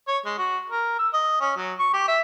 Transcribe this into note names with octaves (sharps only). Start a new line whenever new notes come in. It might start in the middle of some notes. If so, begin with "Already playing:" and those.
C#5
G#3
F#4
A#4
E6
D#5
C#4
F#3
C#6
G4
E5